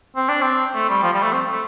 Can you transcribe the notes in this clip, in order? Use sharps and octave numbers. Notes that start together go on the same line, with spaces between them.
C4
D4
C4
A3
G3
F3
G3
A3
C4
A3